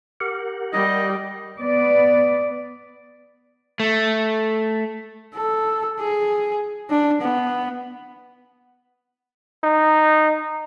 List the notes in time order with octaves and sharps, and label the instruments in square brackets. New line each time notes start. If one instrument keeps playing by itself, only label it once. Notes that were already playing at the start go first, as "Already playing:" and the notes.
[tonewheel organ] G4 A#4 F#5
[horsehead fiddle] G3 [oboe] D#5
[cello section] B3 D5
[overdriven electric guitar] A3
[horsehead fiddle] A4
G#4
D4
B3
[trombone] D#4